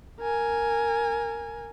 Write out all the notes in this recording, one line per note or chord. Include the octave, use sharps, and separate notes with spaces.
A#4 G#5